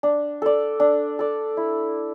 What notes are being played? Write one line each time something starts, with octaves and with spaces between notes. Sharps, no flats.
D4
A4 D5
D4
A4 D5
E4